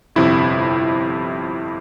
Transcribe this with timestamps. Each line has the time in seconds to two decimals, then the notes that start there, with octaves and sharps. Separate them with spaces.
0.16 G1 F2 C3 E4